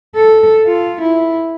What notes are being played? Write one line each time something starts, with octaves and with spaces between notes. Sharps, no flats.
A4
F4
E4